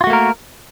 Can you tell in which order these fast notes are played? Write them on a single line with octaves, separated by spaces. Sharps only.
F4 F#4 A3 A#3 A#4